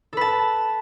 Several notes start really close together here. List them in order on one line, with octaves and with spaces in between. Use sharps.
A4 B4 A5